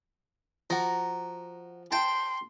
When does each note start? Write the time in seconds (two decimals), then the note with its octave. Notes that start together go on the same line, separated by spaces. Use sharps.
0.70 F3 F#4 A#5
1.92 G5 A5 C6